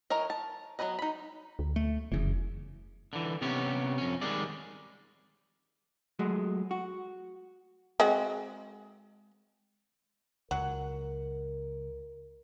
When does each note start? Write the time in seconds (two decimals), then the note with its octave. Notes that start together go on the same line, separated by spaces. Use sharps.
0.10 E3 A#4 C#5 D#5
0.30 A5
0.79 F#3 B3 C#4 B4 D#5
0.99 D#4 B5
1.59 D2
1.76 A3
2.12 F1 F#2 C#3 E3
3.13 D3 E3
3.42 C3 B3 C#4 G4 C#5
3.98 F2 C#4
4.21 D#3 G3 G#3 G#4 D5
6.19 F#3 G#3 A3
6.71 F#4
8.00 G#3 C4 F#4
10.51 C#2 F#3 A#4 F#5